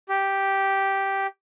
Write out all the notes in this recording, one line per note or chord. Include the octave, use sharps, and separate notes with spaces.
G4